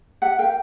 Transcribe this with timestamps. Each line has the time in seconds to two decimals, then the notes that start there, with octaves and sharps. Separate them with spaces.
0.22 G4 E5 F#5
0.39 A#4 F5 G5